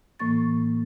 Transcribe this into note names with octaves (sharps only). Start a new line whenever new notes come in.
A2 E3 A#3 C#6 A6